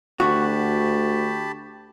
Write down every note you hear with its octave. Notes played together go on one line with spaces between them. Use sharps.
D2 F#4 G4 A5 B5